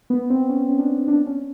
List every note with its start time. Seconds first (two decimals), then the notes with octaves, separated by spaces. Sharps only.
0.10 B3
0.30 C4
0.49 C#4
0.69 C#4
0.79 D4
1.08 D4
1.27 C#4